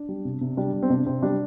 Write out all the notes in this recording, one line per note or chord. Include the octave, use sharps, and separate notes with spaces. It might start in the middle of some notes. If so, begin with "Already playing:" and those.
Already playing: D4
G3
C3
C3
G3 D4
G3
C4
C3 D4
C3 C4
G3 D4